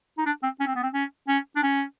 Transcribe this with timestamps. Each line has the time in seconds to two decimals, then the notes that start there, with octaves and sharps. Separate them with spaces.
0.18 D#4
0.26 D4
0.43 C4
0.60 C#4
0.67 C4
0.75 B3
0.83 C4
0.94 C#4
1.28 C#4
1.56 D4
1.63 C#4